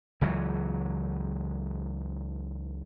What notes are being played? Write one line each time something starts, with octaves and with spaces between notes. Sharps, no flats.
C#2 E3 F#3